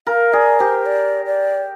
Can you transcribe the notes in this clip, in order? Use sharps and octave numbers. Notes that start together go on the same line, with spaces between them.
A#4 F5
G#4 D5
G4 C5
D5
D5